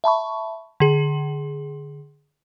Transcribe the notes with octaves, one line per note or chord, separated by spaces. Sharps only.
E5 A5 B5 C#6
D3 G#4